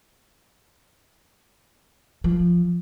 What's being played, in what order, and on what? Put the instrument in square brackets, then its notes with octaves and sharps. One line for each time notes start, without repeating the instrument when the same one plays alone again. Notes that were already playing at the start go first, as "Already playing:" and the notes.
[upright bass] F3